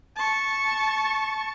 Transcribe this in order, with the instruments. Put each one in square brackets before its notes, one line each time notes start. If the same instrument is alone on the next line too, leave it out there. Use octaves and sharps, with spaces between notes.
[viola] A5 C#6